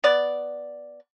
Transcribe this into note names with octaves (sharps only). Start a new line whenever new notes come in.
B3 D5